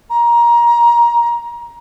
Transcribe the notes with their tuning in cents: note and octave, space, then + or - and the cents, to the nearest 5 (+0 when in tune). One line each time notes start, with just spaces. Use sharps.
A#5 +20